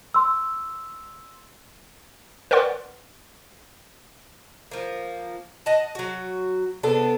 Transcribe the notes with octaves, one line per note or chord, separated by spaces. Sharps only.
C6 E6
A#4 B4 D5 F#5 C6
F3 A#3
D#5 F#5 A5
F#3 F#4
C3 B3 D4 A4